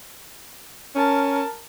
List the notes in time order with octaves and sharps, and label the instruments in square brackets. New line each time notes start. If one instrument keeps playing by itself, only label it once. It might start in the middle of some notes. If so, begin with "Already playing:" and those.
[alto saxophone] C#4 [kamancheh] A#4 A5